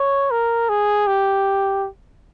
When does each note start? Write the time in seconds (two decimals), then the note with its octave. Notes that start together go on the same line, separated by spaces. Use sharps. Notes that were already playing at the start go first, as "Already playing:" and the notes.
Already playing: C#5
0.31 A#4
0.69 G#4
1.07 G4